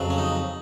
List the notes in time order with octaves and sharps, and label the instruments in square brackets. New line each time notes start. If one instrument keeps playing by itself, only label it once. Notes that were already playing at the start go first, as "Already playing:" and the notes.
Already playing: [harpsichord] F2 C#3 F#3
C#4
D#4